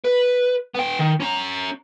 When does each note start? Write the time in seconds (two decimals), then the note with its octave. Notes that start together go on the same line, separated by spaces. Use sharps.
0.05 B4
0.75 B3 G5
1.00 D#3
1.20 C#4 A#5